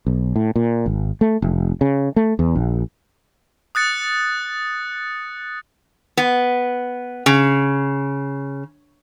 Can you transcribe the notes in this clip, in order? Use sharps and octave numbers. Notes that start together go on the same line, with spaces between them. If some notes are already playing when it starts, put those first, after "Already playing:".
B1
A2
A#2
G#1
A3
F1
C#3
A3
E2
A#1
D#6 F#6 A6 C#7
B3
C#3